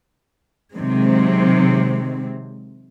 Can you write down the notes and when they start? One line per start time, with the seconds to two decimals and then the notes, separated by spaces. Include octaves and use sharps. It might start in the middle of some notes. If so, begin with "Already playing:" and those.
0.73 C3 D#3 F#3 G#3 C4